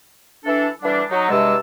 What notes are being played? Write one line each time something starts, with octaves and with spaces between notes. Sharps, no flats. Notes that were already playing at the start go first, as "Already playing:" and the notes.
E3 D4 A4
D3 E3 G3 D4
F#3 D#4
E2 G2 C3 G#3 A5 E6